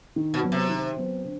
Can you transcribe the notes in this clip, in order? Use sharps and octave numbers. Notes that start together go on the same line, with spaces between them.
D#3
B2
F#3 B3
C3
D#3
F#3 B3
D3